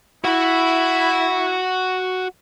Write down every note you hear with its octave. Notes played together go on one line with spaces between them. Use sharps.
E4 F#4 F#5